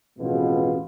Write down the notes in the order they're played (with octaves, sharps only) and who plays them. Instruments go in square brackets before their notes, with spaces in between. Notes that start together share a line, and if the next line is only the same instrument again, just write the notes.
[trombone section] A1 F2 B2 G#3 F4